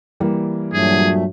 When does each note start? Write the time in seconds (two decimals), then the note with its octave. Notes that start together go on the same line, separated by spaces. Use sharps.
0.20 E3 G3 A#3
0.73 G2 A#2 F#3 A3 G#4